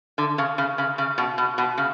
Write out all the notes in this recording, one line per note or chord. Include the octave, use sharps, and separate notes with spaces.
D3
C#3
C#3
C#3
C#3
B2
B2
B2
C#3